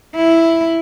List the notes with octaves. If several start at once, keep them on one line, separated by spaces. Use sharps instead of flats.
E4